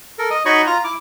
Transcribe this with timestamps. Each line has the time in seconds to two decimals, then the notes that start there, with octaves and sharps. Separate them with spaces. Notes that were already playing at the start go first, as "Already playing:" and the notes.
0.19 A4 A#4
0.31 D#5 D#6
0.45 D#4 F#4 C#5 D#5 B5 C#6
0.67 F4 A#5
0.84 E4 D6